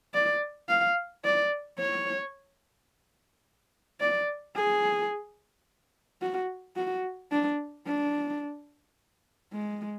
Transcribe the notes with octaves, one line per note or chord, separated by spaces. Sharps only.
D5
F5
D5
C#5
D5
G#4
F#4
F#4
D4
D4
G#3